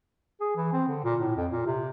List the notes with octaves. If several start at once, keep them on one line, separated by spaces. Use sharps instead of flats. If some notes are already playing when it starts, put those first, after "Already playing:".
G#4
E3
C4
D3
A#2
A2
F2
A#2
C3